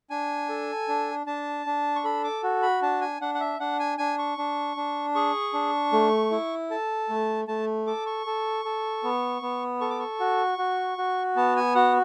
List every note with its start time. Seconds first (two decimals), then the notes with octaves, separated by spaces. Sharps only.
0.10 D4 G#5
0.49 A4
0.88 D4
1.26 D4 A5
1.66 D4
1.96 C#6
2.04 A4 B5
2.24 D6
2.43 F#4
2.62 B5
2.82 D4 A5
3.01 G#5
3.21 D4 F#5
3.35 F#5
3.40 E5
3.60 D4 F#5
3.79 G#5
3.98 D4 G#5
4.18 C#6
4.38 D4
4.77 D4
5.15 G#4 C#6
5.54 D4
5.93 A3
6.31 E4
6.70 A4 A5
7.09 A3
7.48 A3 A5
7.87 A4 D6
8.06 C#6
8.26 A4
8.65 A4
9.04 B3
9.42 B3
9.81 A4 C#6
9.90 D6
9.99 C#6
10.20 F#4
10.58 F#4
10.98 F#4
11.36 B3 A5
11.56 G#5
11.75 F#4 F#5